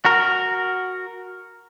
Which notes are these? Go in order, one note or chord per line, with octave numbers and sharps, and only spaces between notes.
F#4 A#4